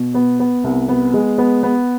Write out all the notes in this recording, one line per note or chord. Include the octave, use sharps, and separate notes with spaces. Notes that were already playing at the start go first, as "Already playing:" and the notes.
Already playing: B2
B3
B3
C2
B3
G#3
B3
B3